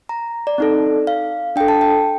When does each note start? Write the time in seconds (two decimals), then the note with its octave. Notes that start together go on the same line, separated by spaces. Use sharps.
0.09 A#5
0.47 D5
0.58 C4 D#4 A4
1.07 F5
1.56 D4 A4 G5
1.68 A5
1.81 G5